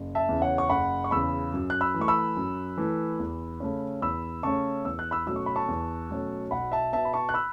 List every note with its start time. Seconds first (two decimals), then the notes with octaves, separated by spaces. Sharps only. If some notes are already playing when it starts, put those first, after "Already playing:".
Already playing: F#1
0.15 E5 A5
0.29 E2 C#3
0.42 C#5 F#5
0.58 C#6
0.70 F#1 F#5 B5
1.04 C#6
1.11 E2 C#3 B5 E6
1.54 F#2
1.70 F#6
1.81 B5 E6
1.94 E3
1.99 A3 C#6
2.08 B5 E6
2.37 F#2
2.78 E3 A3
3.19 E2
3.60 C#3 A3 C#4
4.02 E2 B5 E6
4.43 C#3 A3 C#4 A5 C#6
4.85 E2 E6
4.99 F#6
5.11 B5 E6
5.26 B2 F#3 A3 C#4 E6
5.36 C#6
5.46 B5
5.56 A5 C#6
5.68 E2
6.10 B2 F#3 A3 C#4
6.51 B1 F#5 B5
6.72 E5 A5
6.93 B2 B3 E5 A5
7.05 B5
7.13 A5 C#6
7.29 F#6
7.34 B5 E6